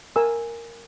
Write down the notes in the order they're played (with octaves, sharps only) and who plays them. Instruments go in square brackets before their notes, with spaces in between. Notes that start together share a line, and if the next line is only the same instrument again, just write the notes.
[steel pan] A#4 G#5 E6